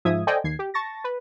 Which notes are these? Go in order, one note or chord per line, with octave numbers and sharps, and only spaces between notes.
G#2 F3 E5 D#6 G#6
A4 C5 D5 D#5 G5 G#5
D#2 G#6 C7
G4
A5 C#6 A6 A#6
B4